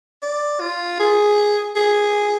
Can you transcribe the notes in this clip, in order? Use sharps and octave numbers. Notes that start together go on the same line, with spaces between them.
D5
F4
G#4
G#4